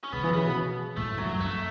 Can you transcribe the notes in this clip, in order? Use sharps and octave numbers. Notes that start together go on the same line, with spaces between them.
C#4
C#3 B3
E3
C#3 B3
B2
A2 A3
F#2 F#3
F#2 A3